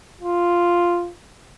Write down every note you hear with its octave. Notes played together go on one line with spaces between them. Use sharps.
F4